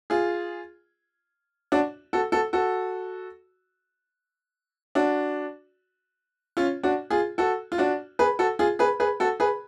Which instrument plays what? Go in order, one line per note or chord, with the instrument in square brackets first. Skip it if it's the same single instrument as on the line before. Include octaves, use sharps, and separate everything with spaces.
[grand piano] F4 G#4
D4 F#4
F#4 A4
F#4 A4
F#4 A4
D4 F#4
C#4 F4
D4 F#4
F4 G#4
F#4 A4
F4
D4 F#4
G#4 B4
F#4 A4
F4 G#4
G#4 B4
G#4 B4
F#4 A4
G#4 B4